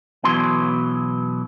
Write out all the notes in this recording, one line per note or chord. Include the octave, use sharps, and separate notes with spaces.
B1 B2 E3 F#3 C6